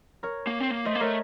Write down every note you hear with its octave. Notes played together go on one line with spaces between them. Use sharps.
A#4 C#5
A#3
C4
A#3
A3 C5 D#5
A#3
A3 A#4 C#5